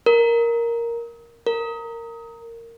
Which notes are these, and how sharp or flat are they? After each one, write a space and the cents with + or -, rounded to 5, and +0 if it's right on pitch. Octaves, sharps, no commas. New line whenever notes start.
A#4 +0
A#4 -15